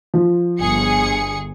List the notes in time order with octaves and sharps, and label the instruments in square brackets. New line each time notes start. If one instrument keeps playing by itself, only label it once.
[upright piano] F3
[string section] G1 G#4 C#7